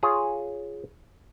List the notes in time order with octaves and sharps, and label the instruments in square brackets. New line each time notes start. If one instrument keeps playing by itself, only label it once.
[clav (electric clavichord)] F4 G#4 C#5